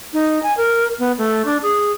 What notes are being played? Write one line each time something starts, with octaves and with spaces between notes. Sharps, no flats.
D#4
G#5
A#4
B3
A3
D4
G#4